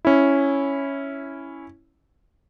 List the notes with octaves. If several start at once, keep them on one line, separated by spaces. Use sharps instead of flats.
C#4 E4